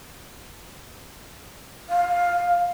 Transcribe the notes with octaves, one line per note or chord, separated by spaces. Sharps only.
F5